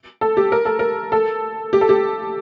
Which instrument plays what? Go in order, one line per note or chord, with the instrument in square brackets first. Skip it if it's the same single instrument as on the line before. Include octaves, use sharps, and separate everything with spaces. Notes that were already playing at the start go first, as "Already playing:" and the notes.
[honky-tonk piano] A4
G4
A#4
A4
A#4
A4
G4
A4
G4